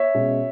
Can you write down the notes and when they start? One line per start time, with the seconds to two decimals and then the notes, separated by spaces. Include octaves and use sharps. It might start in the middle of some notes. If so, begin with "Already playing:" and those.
Already playing: C#5 E5
0.14 B2 G#3 C#4